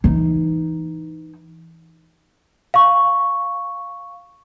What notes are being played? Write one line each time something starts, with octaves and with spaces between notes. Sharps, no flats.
E3 D#4
F5 C#6